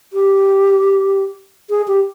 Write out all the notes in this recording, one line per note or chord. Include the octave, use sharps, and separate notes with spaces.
G4
G#4
G4